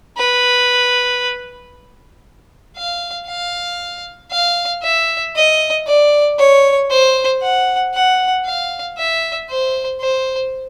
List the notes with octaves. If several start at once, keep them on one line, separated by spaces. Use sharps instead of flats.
B4
F5
F5
F5
E5
D#5
D5
C#5
C5
F#5
F#5
F5
E5
C5
C5